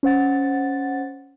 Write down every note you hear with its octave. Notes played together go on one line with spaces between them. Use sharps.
C#4 C5 F#5 A6